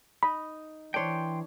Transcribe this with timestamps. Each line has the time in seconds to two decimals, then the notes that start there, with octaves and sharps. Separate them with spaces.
0.23 D#4 D#5 B5
0.94 E3 D4 C5 C#5 G5 C6